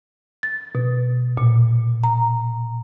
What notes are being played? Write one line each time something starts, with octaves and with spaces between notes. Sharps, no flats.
A6
B2
A#2
A#5